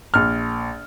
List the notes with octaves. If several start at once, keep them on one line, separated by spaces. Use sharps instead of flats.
A#1 F6